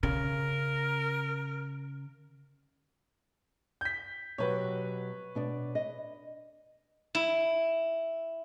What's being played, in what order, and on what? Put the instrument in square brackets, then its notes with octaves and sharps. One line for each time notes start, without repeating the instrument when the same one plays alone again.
[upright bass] C#3 [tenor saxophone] A#4
[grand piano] G6 B6
[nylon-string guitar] B2 F#3 G4 [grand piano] B4 C#5
[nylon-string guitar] B2 D4 D5
D#5
[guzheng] E4